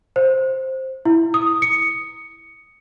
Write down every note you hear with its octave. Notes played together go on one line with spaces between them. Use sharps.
C5
E4
D#6
C#7